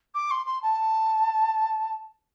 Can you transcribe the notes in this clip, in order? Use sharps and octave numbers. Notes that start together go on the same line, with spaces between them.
D6
C6
C6
A5